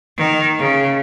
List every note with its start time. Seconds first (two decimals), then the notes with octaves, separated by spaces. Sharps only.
0.17 D#3
0.59 C#3